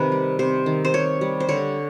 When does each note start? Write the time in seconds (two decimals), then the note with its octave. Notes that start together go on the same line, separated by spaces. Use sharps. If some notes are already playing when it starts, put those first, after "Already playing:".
Already playing: C3 D#3 B4
0.12 G3
0.39 C3 C5
0.66 D#3
0.85 C5
0.94 C3 C#5
1.21 G3
1.40 C5
1.48 D3 C#5